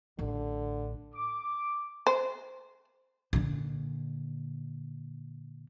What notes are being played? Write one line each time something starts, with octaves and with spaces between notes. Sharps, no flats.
A1 A2 D3
D6
C5
A#2 D3